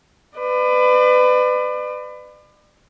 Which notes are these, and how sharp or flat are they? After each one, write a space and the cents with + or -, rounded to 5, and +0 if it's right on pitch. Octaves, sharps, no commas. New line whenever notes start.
B4 +30 D5 +35